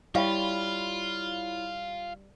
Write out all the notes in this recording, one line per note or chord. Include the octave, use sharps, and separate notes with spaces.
G3 E4 F4 C#5 F5 B5 C#6